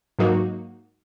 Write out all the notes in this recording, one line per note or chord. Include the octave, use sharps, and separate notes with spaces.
G#2 F#3 A#3 D#4 F#4